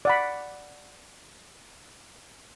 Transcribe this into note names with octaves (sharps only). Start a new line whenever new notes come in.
D5 F#5 B5